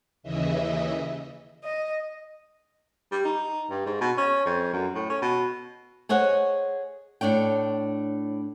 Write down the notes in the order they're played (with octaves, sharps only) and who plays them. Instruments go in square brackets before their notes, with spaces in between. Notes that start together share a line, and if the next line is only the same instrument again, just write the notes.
[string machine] D#2 C#3 E3 D#5 E5
[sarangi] D#5
[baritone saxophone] G3
D#4
G2
G#2
B2
C#4
F2
F#2
A2
C#4
B2
[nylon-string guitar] G#4 C5 C#5 D#5 F#5
A2 D4 C#5 G5